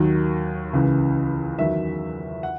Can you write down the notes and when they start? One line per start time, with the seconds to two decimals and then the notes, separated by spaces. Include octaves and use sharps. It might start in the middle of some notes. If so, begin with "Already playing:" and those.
Already playing: D#2 D#3 F#3
0.73 C#2 C#3 E3
1.58 E2 D#3 F#3 E5
2.43 F#5